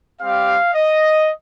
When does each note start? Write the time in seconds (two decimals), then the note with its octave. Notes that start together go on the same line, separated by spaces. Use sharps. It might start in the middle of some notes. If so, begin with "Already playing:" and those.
0.20 G3 C4 G4 F5
0.74 D#5